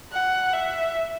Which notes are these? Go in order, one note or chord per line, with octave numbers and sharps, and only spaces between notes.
F#5
E5